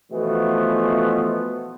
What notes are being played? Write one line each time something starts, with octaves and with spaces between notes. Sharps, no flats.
B2 E3 F3 A3 B3